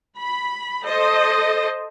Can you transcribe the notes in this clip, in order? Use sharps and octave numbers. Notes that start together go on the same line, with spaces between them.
B5
A4 C5 D#5